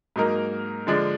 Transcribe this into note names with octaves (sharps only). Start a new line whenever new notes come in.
G#2 F#3 A#3 D#4 A#4
D3 F3 G#3 D4